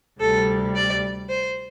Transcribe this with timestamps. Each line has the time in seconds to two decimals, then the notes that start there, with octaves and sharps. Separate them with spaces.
0.20 D2 C3 G3 A4
0.75 D5
1.29 C5